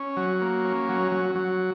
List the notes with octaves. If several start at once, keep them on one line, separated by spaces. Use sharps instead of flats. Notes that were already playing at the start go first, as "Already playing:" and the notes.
Already playing: C#4
F#3
A#3
C#4
F#3
F#3
F#3